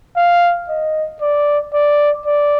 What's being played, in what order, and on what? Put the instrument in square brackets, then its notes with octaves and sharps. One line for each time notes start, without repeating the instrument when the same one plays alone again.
[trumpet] F5
D#5
D5
D5
D5